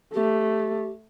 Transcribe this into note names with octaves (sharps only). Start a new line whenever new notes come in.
A3 G4